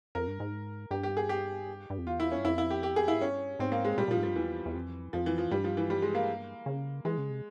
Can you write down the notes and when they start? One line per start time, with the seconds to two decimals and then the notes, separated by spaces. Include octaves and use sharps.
0.15 F2 A#4
0.27 G2
0.40 G#2
0.91 G2 G4
1.03 G4
1.17 G#4
1.29 G4
1.90 G2
1.98 F2
2.06 E2 F4
2.20 E4
2.32 C#4
2.37 G2
2.45 F2 E4
2.58 E4
2.70 G4
2.83 G4
2.96 G#4
3.08 E4
3.13 G#2
3.21 G2 C#4
3.59 G#2 C4
3.72 A#3
3.85 G#3
3.98 A#2 G3
4.08 A#2 F3
4.17 G#2
4.23 G2 F3
4.36 E2 E3
4.66 E2
4.74 F2
5.13 F2 F3
5.26 E3
5.38 F3
5.51 G2 G3
5.64 F3
5.77 E3
5.90 G3
6.02 G#3
6.15 A#3
6.66 C#3
7.05 E3 G#3
7.18 C#3
7.30 C3